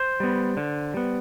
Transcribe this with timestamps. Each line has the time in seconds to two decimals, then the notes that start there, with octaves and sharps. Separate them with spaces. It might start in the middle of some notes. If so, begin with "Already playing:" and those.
Already playing: C5
0.20 G3 B3
0.57 D3
0.94 G3 B3